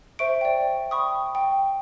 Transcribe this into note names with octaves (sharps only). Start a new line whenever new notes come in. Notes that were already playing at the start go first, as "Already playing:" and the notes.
C5 E5 C#6 D7
D5 G5
G5 B5 C#6 D#6
G5